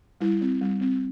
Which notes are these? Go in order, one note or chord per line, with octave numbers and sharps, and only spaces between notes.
G3 E4
C4
G3
C4